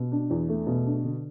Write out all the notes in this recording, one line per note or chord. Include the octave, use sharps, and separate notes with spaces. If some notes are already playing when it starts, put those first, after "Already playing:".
Already playing: B2
D4
E2
A3
B2
D4
D3